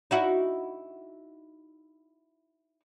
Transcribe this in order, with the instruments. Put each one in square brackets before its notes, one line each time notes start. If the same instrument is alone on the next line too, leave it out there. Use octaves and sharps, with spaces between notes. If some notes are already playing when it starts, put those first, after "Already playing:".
[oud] D#4 E4 F#4